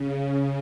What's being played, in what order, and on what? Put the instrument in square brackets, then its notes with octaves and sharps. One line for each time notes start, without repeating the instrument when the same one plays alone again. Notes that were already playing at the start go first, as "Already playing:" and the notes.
Already playing: [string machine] C#3